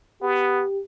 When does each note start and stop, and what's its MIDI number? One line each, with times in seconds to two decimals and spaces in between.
0.22 0.64 59
0.22 0.81 67